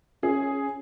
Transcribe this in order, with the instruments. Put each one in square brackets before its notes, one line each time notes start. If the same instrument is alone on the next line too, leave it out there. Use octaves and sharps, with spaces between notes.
[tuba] C#4 [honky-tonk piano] G#4